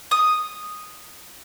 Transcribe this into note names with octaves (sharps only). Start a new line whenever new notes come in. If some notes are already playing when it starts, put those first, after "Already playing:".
D#6